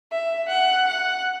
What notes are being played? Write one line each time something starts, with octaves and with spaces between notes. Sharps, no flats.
E5
F#5
F#5